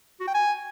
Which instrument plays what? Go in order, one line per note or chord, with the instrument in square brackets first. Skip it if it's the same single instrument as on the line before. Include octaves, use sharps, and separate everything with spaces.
[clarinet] F#4
G5
G#5